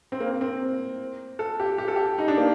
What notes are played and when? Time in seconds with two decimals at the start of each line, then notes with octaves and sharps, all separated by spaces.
0.12 C4
0.20 A#3
0.41 C4
1.39 A4
1.60 G4
1.78 G4
1.88 A4
1.96 G4
2.18 D#4
2.28 D4
2.38 A#3